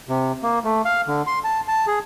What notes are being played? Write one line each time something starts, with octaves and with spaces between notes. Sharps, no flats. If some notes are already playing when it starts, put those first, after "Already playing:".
C3
A#3
A3
F5
D3
C6
A5
A5
G#4